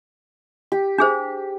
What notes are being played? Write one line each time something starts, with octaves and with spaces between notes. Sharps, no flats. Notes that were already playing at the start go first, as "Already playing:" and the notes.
G4
D4 G#4 C5